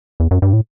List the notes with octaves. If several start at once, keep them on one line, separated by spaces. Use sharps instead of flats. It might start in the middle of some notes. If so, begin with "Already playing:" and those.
E2
F#2
G2
A2